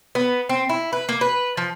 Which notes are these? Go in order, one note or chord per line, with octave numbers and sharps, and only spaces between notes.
B3
C4
E4
B4
A#3
B4
F3